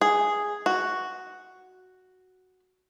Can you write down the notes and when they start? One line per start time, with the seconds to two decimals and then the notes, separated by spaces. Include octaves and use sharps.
0.01 G#4
0.66 F#4